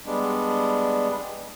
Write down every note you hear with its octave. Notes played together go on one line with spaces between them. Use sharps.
G3 G#3 B3 D4